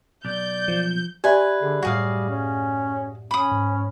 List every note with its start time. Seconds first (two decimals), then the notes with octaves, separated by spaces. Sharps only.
0.25 B1 D5 G6
0.68 F3
1.24 G4 B4 D5 E5 G#5
1.63 D3 G#4
1.82 F#2 A2 G3 F#4 G#4 F5
2.29 C#4
3.31 C#4 B5 D#6
3.52 G#2